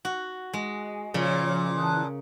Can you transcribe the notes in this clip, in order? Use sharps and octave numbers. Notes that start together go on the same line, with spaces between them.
F#4
G#3
A#2 C#3 F3 C#5
E3 A5 D#6 F#6